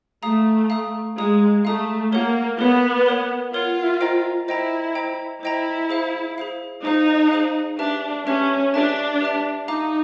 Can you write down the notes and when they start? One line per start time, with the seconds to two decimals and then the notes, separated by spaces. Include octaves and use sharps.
0.23 A3 F5 A#5 D#6
0.70 F5 A#5 D#6
1.17 G#3 F5 A#5 D#6
1.65 A3 F5 A#5 D#6
2.12 A#3 A#4 C#5 F#5
2.59 B3 A#4 C#5 F#5
3.06 A#4 C#5 F#5
3.54 F4 A#4 C#5 F#5
4.01 C5 D#5 G5 A#5
4.48 E4 C5 D#5 G5 A#5
4.95 C5 D#5 G5 A#5
5.43 E4 C5 D#5 G5 A#5
5.90 G#4 C5 F5
6.38 G#4 C5 F5
6.85 D#4 G#4 C5 F5
7.31 G#4 C5 F5
7.79 D4 G4 B4 E5 A5
8.27 C#4 G4 B4 E5 A5
8.74 D4 G4 B4 E5 A5
9.21 G4 B4 E5 A5
9.68 D#4 F5 A#5 D6